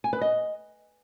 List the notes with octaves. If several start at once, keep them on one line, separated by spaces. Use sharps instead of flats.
G#5
B4
D#5